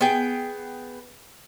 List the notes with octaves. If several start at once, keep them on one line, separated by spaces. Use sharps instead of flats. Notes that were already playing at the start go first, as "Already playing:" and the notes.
B3 G#4 G5